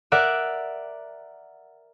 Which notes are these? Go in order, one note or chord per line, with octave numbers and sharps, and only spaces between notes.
A#4 D5 E5 F#5